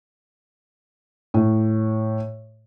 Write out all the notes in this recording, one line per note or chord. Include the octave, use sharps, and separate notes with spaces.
A2